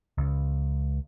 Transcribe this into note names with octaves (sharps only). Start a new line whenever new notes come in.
C#2